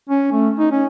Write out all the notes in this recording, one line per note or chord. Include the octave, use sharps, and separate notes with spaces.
C#4
A3
D#4
C#4